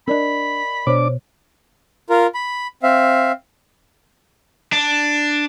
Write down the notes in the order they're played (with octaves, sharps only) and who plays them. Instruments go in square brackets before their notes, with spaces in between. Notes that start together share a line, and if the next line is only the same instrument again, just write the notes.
[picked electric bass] C4 D4 [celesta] A#4 D5 D#5 [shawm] B5
[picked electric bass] B2 [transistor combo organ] D4 D6 [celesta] C5 C#5
[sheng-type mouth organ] F4 A#4
B5
C4 E5 F5
[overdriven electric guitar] D4